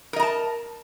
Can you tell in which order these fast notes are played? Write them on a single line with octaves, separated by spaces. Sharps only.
A#4 D#5 A#5 A5